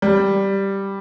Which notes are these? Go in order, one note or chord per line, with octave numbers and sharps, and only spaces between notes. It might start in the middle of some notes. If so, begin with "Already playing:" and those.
G3